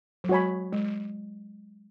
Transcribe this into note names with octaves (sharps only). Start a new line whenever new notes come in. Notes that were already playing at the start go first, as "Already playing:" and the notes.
F#3
G#3 F#4 C#5 G#5 B5
G#3